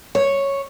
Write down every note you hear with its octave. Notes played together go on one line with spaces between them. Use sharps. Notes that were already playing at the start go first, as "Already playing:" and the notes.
C#5